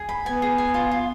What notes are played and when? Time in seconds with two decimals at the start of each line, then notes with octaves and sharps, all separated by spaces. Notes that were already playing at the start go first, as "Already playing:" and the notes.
Already playing: G#4
0.09 B5
0.26 B3 G#5
0.42 G#4
0.58 G#5
0.74 F4
0.91 F4